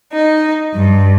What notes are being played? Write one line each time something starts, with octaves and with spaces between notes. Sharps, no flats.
D#4
G2